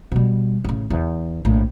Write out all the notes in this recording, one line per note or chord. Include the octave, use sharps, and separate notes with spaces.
B2 G3
A1 C#3
E2
A#1 A2